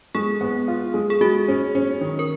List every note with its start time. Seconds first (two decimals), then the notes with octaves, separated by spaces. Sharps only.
0.15 G#3 G#4
0.41 B3
0.68 F4
0.94 G#3
1.10 G#4
1.21 G#3 F#4
1.48 C#4
1.75 C#4
2.01 D#3
2.19 A#4